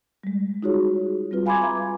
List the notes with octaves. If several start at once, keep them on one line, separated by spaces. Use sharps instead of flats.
G3 G#3
D#4 F4 F#4 G#4 C#5
G3 C4 F4 B4
F5 G#5 B5 C6 D6 G#6
B4 E5 F5 A#5 D6